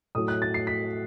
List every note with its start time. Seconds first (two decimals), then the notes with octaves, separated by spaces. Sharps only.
0.15 A2 F#3 D#6
0.28 F#6
0.42 A6
0.54 C7
0.67 B6